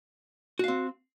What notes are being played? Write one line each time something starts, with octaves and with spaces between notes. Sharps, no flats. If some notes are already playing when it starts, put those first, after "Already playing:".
C4 F#4 F5